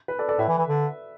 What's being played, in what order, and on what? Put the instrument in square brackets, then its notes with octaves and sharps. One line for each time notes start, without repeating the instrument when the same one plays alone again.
[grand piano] B4
A4 D5
A4 D5
[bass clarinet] A2 [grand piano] B4 E5
[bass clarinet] E3
E3
D3